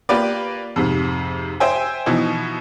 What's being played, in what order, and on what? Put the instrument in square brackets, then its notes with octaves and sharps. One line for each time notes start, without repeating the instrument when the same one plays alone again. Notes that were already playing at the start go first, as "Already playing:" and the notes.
[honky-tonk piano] A#3 F4 G4 B4 D5
F2 G#2 C3
C5 E5 G5 G#5
B2 E3 F3 D#4 E4